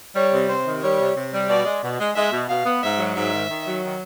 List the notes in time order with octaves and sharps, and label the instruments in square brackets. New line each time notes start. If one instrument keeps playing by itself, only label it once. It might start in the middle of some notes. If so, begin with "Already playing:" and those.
[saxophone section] G3 [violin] C#5
[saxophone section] C3
[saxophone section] C3 [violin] C5
[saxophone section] D#3
[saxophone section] G3 [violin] C#5
[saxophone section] C3
C3
G3
[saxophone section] B2 [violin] D5
[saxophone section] G#3
B2
G#3
[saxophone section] G#3 [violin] E5
[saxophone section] B2
[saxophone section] B2 [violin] F5
[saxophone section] B3
[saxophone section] G#2 [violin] E5
[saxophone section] F#3
[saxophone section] G#2 [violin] E5
[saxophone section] D#3
D#3
F#3
D#3